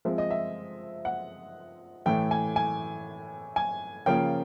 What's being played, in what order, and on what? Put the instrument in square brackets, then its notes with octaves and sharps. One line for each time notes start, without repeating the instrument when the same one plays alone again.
[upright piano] F3 G#3 C4 E5
D#5
E5
F#5
A2 E3 A3 G5
G#5
G#5
G#5
C#3 F3 A#3 C#4 G5